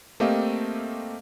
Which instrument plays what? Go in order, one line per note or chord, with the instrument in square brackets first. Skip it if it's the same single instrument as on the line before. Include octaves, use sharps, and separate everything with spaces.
[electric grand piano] A3 A#3 C4 G4 D#5 F5